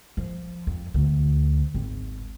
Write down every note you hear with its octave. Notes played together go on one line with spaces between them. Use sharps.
F3
F2
D2
G#1